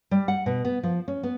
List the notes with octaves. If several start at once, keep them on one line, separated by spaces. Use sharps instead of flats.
G3
F#5
B2
B3
F3
C#4
B3